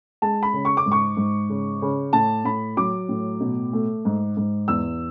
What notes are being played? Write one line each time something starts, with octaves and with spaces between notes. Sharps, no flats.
G#3 A5
B5
C#3
C#6
D6
G#2
C#6
G#2
C#3
C#3
A2 A5
A2 B5
F#3 D6
A2
B2
A3
G#2
G#2
E2 E6